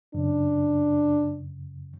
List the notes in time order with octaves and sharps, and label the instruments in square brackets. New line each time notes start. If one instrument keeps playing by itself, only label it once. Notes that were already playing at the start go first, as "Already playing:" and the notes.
[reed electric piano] F#2 C#3 [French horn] D4